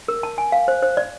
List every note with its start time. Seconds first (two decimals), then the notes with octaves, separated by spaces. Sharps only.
0.08 A#4
0.23 A5
0.38 G#5
0.52 F5
0.68 C5
0.83 C5
0.97 D5